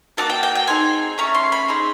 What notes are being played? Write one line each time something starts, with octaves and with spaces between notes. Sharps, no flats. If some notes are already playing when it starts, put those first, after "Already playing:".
A#3 D#4 F#4 A4 A5
G5
G5
G5
C4 D#4 G#4 G#5
A3 C#4 E4 A#5
C6
B5
C4 D#4 G#4